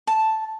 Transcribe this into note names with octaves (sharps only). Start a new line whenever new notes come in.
A5